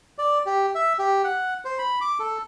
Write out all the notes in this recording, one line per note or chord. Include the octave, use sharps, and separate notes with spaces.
D5
G4
E5
G4
F#5
C5
B5
D6
A4